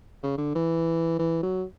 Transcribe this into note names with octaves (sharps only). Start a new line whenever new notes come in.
C#3
D3
E3
E3
F#3